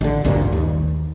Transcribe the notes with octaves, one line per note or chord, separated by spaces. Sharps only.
A1 D3
A1 D2 G2 A#2
D#2